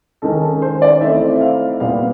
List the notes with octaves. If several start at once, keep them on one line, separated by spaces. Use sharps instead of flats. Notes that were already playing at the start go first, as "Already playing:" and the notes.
D#3 G#3 C#4 A4
A4
C5
D5
E3 A3 C4 D#4 E5
E5
F5
A#2 G3 B3 F5